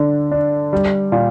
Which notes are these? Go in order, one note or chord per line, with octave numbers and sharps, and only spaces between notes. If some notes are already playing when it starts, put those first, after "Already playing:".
Already playing: D3 D4
D4
G3
A#2